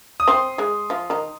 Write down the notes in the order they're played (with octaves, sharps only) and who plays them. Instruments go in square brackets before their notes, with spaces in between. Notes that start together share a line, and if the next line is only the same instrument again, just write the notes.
[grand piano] D#6
[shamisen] C4 C5 [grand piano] C6
[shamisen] G#3 G#4
F3 F4
D#3 D#4